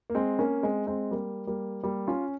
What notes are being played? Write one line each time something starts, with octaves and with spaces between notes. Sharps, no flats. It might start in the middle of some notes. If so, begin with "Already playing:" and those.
A#3
G#3 C4
A#3 C#4
G#3 C4
G#3 C4
G3 A#3
G3 A#3
G3 A#3
C#4 F4